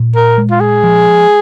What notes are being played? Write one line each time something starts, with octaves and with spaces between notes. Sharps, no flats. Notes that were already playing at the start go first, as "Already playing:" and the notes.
Already playing: A#2
A#4
G#3
F4
G#4
F3